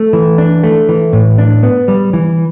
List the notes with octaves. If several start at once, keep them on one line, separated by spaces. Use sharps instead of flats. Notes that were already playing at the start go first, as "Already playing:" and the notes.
Already playing: A3
E3
D4
A3
E3
A2
D4
B3
G3
E3